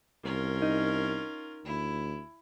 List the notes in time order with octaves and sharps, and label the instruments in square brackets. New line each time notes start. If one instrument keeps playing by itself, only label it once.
[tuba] C2 [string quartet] C#4 F4 A#4
[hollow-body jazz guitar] D#4
[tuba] D2 [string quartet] E4